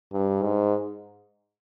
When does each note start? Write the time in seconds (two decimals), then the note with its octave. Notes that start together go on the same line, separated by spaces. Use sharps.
0.13 G2
0.43 G#2